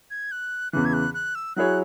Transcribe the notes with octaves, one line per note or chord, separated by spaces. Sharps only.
G#6
F#6
E2 C#3 E3 F#6
G#6
F#6
F#6
E6
F#3 E4 G#4 C#5 F#6